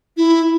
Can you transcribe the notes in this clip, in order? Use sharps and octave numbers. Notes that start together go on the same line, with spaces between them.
E4